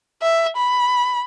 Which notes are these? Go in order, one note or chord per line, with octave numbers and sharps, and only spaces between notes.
E5
B5